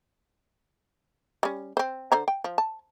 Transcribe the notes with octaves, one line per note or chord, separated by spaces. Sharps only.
G3 C#4
C4 C5
D3 C5 A#5
G5
F3
A5